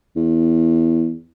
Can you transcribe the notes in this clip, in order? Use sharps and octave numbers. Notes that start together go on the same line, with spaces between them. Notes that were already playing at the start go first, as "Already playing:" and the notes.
E2